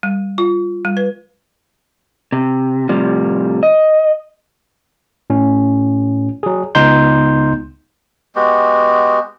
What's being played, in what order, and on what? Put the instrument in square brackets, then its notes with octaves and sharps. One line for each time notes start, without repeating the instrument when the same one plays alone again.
[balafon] G3
F4
G3
B4
[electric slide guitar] C3
A2 C3 F3 G3
D#5
[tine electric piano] A2 C#4
F#3 G#4
C#2 B3 D#4 C6 G6
[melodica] G#3 B3 F#4 G4